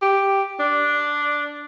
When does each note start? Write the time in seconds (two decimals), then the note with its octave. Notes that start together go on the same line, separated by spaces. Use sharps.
0.02 G4
0.60 D4